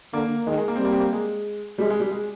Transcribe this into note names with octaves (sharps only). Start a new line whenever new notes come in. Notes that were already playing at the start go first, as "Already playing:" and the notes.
D3 A#3
D#3 G#3
G#3
A#3
C4
G3
A#3
C4
A#3
G#3
G3 G#3
G#3
G3
G#3